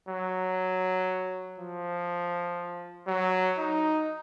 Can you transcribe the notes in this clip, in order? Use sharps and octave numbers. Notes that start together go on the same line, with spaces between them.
F#3
F3
F#3
D#4